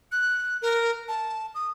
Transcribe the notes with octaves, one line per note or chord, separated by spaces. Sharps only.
F#6
A#4
A5
D#6